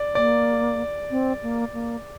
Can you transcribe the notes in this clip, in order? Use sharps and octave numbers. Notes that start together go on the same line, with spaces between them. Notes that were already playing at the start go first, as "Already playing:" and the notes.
Already playing: D5
A#3 D5
C4
A#3
A#3